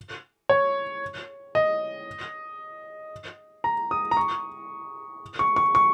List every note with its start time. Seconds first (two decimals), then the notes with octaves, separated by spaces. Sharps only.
0.49 C#5
1.55 D#5
3.64 A#5
3.91 D#6
4.11 A#5
4.17 C#6
5.39 C#6
5.56 C#6
5.75 C#6